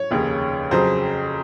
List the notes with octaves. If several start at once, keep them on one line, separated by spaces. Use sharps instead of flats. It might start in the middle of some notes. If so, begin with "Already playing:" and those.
Already playing: C#5
F1 D#2 C#3
F2 C#3 F#3 C5